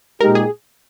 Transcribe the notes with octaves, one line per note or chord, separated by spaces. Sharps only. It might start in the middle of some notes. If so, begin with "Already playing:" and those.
A#2 G#3 D#4 G4 A#4
G#4